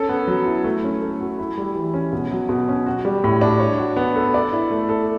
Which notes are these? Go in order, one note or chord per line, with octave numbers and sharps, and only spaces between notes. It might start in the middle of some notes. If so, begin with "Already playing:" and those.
Already playing: C#4 A4
B3
F#3
E4
A3
C#4
A3
F#4
E4
G3
E3
C#4
B2
F#3
B2
C#4
F#4
G3
A2
D4
C#5
F#4
B3
A4
D5
E4
A3
A4